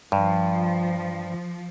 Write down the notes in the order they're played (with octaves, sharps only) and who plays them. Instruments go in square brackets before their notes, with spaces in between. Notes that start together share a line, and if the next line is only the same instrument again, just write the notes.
[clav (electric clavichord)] G2 [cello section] F3